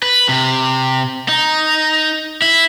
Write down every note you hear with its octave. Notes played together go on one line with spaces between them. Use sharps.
B4
C3
D#4
E4